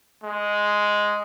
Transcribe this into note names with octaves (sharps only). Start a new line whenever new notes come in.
G#3